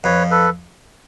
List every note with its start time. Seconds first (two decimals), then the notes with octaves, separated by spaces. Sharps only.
0.04 F2 B4 C#5
0.31 A4 B4